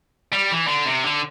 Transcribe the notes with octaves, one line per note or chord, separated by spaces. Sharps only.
G3
E3
D3
C3
D3